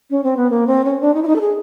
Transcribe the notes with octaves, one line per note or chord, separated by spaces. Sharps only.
C#4
C4
B3
A#3
C4
C#4
D4
D#4
E4
D#4
A4
G#4